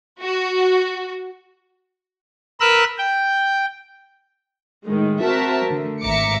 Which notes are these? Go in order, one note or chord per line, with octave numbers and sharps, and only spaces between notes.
F#4
A#4 B4 E6 F#6
G5
A2 D#3 G#3
C4 F#4 A#4 C5 E5 A5
D3 A3
G#1 E5 A#5 D6 C#7